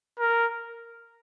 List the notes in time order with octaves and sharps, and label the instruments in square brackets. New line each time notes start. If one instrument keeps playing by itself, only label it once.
[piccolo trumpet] A#4